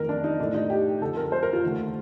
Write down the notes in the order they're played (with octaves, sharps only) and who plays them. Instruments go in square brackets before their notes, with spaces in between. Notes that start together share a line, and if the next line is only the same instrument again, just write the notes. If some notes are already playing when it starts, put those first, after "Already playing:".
Already playing: [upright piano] F2 D#3 A3 A#4
D4
D#4
A2 A3 D4
D#4
G4
F2 D3 F3 A4
A#4
C5
A#4
F4
D#2 D3 A3